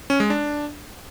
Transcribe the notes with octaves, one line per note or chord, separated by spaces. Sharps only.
C#4
G#3
D4